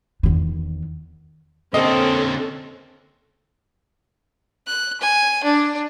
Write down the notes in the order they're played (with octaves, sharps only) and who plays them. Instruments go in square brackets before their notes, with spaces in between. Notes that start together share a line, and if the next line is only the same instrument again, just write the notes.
[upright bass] E2 D#3
[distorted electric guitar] D3 A#3 [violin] C4 [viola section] C#4 A4 [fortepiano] D#5
[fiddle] F#6
G#5
D4